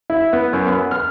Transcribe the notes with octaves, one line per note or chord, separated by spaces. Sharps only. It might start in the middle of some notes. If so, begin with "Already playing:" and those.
E4
B3
F#2
B3
F6